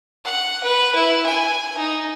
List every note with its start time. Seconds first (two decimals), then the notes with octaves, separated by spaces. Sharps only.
0.25 F#5
0.63 B4
0.95 E4
1.26 G#5
1.77 D#4